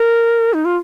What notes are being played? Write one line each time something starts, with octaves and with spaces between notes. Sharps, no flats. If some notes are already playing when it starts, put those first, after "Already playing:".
Already playing: A#4
D#4
F4